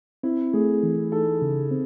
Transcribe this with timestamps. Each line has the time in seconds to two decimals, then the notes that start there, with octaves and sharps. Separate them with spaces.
0.23 C4 E4
0.53 A3 G#4
0.83 E3
1.12 D#4 A4
1.42 C#3
1.71 C4